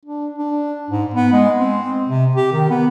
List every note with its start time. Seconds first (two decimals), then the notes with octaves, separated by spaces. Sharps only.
0.05 D4
0.39 D4
0.91 G#2
1.14 B3
1.33 G#3
1.59 C4
2.08 C3
2.36 G4
2.53 D#3
2.70 B3